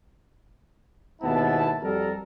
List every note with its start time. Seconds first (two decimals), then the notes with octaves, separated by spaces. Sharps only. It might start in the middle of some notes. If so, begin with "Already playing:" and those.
1.22 D#2 G#2 B2 B3 E4 A5
1.81 F2 G3 F#4 A4 A#4